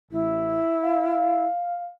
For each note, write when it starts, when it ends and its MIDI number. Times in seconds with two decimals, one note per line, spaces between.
0.11 0.60 33
0.11 1.43 64
0.84 1.89 77